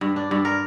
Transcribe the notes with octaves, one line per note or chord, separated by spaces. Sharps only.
G2
D4
G2
A#4